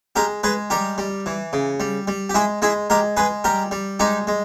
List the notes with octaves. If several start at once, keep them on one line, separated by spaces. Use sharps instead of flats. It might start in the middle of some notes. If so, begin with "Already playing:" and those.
G#3 G4 A#4
G#3 G#4 B4
G3 G4 A#4
G3
E3
C#3
G3
G3
G4
G#3 E4 G#4
G#3 E4 G#4
G#3 G4 A#4
G#3 G#4 B4
G3 G4 A#4
G3
G#3 D#4 G4
G#3